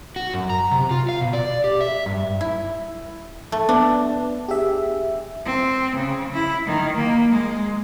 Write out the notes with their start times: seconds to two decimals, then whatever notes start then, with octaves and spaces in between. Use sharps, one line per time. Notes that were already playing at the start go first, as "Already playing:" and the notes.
0.16 F#4
0.34 F#2
0.50 A#5
0.71 C3
0.91 F4
1.09 F5
1.21 B2
1.33 D5
1.64 G4
1.81 E5
2.06 G2
2.41 E4
3.52 A3
3.69 B3 D4
4.48 G4 G#4 E5
5.45 C4
5.95 C#3
6.33 E4
6.66 D#3
6.96 A#3
7.31 G#3